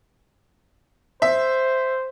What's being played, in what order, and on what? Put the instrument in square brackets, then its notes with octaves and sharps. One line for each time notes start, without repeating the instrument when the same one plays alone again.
[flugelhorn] C5 [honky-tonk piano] E5